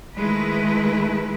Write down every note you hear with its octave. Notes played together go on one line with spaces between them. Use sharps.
D#3 G#3 A3 E4 B4